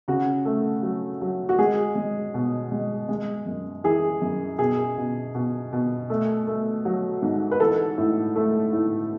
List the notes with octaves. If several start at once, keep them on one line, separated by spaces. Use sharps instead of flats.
C#3 F#4
A3
F#3
F#3
F#4
G#3 G#4
G#3
B2
G#3
G#3
F#2
E3 G#4
F#2
B2 G#4
B2
B2
B2
A3
A3
F#3
G#2
B4
E3 A4
A2
A3
A2